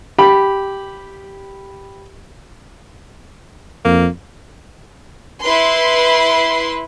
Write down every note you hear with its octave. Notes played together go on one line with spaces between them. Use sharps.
G4 B5
F2 A#3
E4 B4 C6